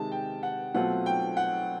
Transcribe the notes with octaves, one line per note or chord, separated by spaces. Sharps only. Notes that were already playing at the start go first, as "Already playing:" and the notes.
Already playing: C3 D#3 G#3 A5
G5
F#5
B2 F#3 A3 C4 F4 F#5
G5
F#5